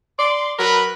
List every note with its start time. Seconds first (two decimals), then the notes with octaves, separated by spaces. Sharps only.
0.18 D5 C6
0.58 F#3 A#4 B4